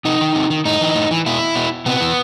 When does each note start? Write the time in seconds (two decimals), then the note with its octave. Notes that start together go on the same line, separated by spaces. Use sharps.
0.05 C3 D#4
0.21 D#3
0.35 C3
0.50 D#3
0.65 A2 D#4
0.81 E3
0.95 A2
1.11 E3
1.26 B2 E4
1.56 B2
1.86 C3 B3
2.01 E3